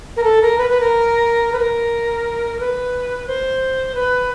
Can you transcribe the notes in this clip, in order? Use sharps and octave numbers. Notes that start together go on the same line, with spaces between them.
A#4
A4
A#4
B4
B4
A#4
B4
A#4
B4
C5
B4